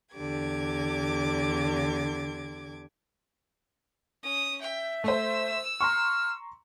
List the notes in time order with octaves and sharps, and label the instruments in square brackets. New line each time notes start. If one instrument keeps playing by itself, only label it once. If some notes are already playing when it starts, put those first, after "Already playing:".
[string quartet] E2 D3 G4 D6 G#6
[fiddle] C#4 D#6
[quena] E5 [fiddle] G5
[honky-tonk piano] A3 C5 [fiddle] E6
[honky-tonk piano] A#5 C6 C#6 [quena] F6